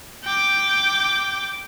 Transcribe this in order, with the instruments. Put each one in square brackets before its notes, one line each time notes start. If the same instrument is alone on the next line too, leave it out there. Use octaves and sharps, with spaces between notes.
[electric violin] G5 D6